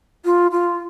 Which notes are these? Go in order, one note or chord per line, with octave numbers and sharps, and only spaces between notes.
F4
F4